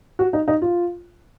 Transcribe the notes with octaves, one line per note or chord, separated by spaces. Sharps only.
F#4
D#4
D#4
F4